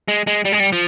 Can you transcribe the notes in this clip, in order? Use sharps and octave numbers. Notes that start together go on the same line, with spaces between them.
G#3
G#3
G3
G#3
G3
F3